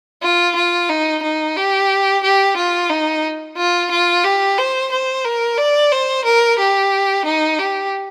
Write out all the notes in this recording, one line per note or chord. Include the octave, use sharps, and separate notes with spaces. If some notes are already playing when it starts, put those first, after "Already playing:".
F4
F4
D#4
D#4
G4
G4
F4
D#4
F4
F4
G4
C5
C5
A#4
D5
C5
A#4
G4
D#4
G4